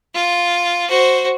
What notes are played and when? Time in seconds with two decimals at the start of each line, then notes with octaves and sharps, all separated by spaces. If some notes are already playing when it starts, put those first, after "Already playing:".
0.14 F4
0.89 F#4 C5